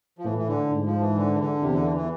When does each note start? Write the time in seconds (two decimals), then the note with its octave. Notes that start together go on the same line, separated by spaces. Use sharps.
0.18 F3
0.24 A2 E3
0.38 E3
0.48 D3
0.71 G#2
0.86 F3
1.01 E3
1.16 D3
1.33 E3
1.40 D3
1.62 E2 C3
1.74 D3
1.85 E3
1.97 E3